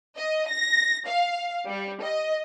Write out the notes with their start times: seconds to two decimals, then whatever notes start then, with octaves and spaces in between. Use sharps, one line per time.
0.17 D#5
0.49 A#6
1.07 F5
1.67 G3
2.03 D#5